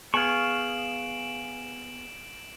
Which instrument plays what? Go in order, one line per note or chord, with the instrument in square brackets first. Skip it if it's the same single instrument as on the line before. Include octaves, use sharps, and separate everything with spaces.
[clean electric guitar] B3 G#4 [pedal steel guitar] F5 C#6 [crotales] D7 E7 F#7